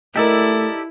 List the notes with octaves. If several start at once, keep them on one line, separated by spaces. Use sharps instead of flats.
A3 E4 G4 A4 A#4 D5 D#5